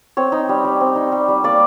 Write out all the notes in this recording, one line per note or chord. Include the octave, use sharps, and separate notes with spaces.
C4 C#5
D#4
G3
G3
C4
D#4
G3
G3
A#3 D5